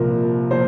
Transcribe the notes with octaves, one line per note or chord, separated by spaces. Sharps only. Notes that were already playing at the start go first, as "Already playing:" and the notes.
Already playing: C2 A#2 F3 A#4
A#2 F3 C5